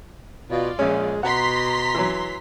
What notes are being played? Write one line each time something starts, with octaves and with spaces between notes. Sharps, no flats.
B2 F4 D5
A#1 G#3 C#4
B2 F#5 A#5 C6 B6
E3 F#3